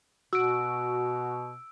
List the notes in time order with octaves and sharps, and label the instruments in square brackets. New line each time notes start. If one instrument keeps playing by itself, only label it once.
[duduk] B2 [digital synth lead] F#4 [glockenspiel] E6 D7